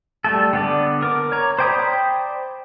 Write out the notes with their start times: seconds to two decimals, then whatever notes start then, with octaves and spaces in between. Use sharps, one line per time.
0.24 G3 A3 A4
0.53 D3 B3 D5
1.02 A#4 D6
1.32 C#5 A#5
1.59 C5 D5 G5 B5 D#6